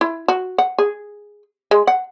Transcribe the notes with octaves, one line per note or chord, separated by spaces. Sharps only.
E4
F#4
F#5
G#4
G#3
F#5